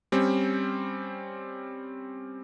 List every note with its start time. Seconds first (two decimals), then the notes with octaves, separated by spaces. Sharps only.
0.12 G3 C4 C#4